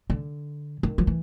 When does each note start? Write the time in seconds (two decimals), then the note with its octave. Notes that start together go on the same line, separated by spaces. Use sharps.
0.10 D3
0.83 D#3
0.98 F3
1.07 E3